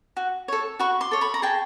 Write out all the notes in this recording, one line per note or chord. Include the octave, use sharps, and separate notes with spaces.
F#4
A4 C#5
F#4 B5 C#6
C6 D6
A4 C#5
B5 C#6
A#5
G#4 G5 A5